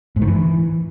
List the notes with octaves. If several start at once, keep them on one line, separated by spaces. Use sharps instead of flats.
G#2
D#3
E3